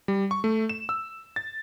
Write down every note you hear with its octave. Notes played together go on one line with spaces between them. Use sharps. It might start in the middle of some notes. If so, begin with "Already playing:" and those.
G3
C#6
A3
E7
E6
A6